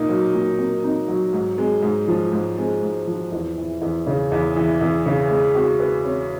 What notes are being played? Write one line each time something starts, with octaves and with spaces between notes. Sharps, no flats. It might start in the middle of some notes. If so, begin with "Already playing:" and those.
Already playing: A#2 A#3 D#4
F#3
A#2
A#3
D#4
F#3
G#2
G#3
G#2
F3
G#2
G#3
G#2
F3
E2
E3
E2
C#3
E2
E3
E2
C#3
G#3
F#4
B4
C#4